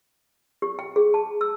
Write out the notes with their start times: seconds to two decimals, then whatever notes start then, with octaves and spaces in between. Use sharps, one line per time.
0.62 G4
0.79 G5
0.96 G#4
1.14 A5
1.41 E6